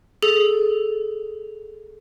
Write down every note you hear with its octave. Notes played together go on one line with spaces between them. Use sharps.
G#4 A4